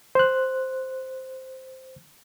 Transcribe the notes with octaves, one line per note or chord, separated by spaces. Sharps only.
C5 F#6